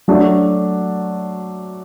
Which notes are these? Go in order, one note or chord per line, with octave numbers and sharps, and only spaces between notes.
F#3 A3 D4 F#4